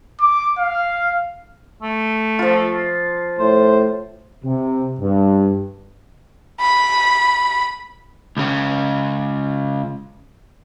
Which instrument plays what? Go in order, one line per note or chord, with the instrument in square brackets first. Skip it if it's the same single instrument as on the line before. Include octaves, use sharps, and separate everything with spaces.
[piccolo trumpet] D6
F5
[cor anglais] A3
[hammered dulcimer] F3 F4
[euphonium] A2 [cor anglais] C5
[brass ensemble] C3
G2
[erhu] B5
[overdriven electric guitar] C#2 C#3